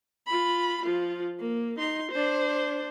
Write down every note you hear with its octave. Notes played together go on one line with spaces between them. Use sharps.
F4 B5
F3 F4
A#3
D#4 C6
D4 C5